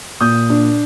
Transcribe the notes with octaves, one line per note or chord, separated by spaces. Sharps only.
A#2 D#6 G6
D4